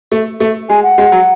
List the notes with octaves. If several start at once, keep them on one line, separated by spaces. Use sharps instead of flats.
A3
A3
G#3 G#5
F#5
G#3
F#3